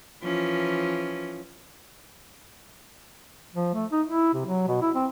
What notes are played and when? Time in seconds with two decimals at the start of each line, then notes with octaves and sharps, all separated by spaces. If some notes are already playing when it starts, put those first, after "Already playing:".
0.23 E3 F3 C#4
3.55 F3
3.74 A3
3.92 D#4
4.08 E4
4.33 C3
4.46 F#3
4.67 B2
4.82 E4
4.95 C4